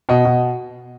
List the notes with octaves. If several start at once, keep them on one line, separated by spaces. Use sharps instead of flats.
B2 D#5
B2